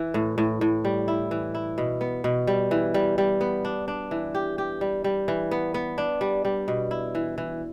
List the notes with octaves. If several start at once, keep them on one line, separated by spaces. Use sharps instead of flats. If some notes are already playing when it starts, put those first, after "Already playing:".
Already playing: E3
A2
A2
A2
G3
E4
E3
E4
B2
B3
B2
G3
E3
G3
G3
B3
D4
D4
E3
G4
G4
G3
G3
E3
B3
B3
D4
G3
G3
B2
E4
E3
E3